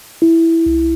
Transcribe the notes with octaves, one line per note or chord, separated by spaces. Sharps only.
E4
C2